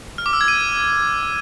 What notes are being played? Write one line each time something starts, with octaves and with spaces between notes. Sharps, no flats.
F6
D6
E6
G#6
D#7